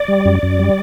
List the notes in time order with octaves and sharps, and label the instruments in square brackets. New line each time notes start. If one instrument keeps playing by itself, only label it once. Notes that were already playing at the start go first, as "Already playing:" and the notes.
Already playing: [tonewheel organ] D5
G3
F#2
F#2
G3